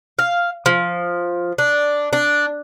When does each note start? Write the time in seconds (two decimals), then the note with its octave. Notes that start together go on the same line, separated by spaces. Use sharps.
0.19 F5
0.66 F3
1.58 D4
2.13 D4